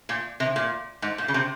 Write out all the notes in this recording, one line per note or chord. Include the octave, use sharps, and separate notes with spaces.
A#2
C3
A#2
G#2
A#2
C#3
C3